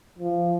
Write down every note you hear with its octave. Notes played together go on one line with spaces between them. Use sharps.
F3